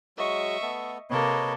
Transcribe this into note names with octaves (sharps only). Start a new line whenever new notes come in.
F#3 G#3 F#4 D#5 E5 C#6
A3 B3 A4
C3 A#3 A4 B4 C#5 D#5